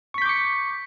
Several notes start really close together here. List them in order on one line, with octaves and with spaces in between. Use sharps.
C#6 B6 G6 D6 C#7